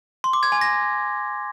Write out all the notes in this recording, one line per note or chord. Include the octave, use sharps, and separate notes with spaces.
C6
D6
G#6
G#5
A#6